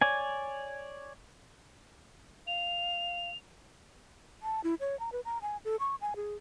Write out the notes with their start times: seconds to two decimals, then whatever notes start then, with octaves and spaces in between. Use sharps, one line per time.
0.01 C#5 D5 G#5
2.47 F5 F7
4.43 A5
4.64 E4
4.80 C#5
5.00 A#5
5.12 B4
5.25 A#5
5.42 G#5
5.65 A4
5.80 C#6
6.01 G#5
6.16 G#4